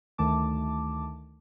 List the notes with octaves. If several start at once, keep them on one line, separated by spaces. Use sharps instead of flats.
D2 D#3 A3 A5 D6